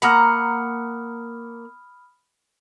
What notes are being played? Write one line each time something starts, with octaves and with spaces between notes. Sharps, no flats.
A#3 F#5 A#5 B5 D#6 F6